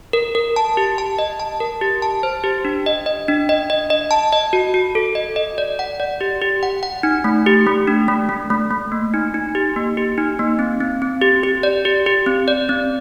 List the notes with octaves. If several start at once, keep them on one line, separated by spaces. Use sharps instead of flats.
A#4
A#4
A5
G4
A5
D#5
A5
A#4
G4
A5
C5
G4
D4
D#5
D#5
D4
D#5
D#5
D#5
A5
D#5
F#4
F#4
A4
D#5
D#5
D5
F#5
D5
G4
G4
F#5
F#5
D#4
A3
G4
A3
D4
A3
A3
A3
A3
A#3
D#4
D#4
G4
A#3
G4
D#4
A#3
C4
C4
C4
G4
G4
D5
G4
G4
C4
D5
C4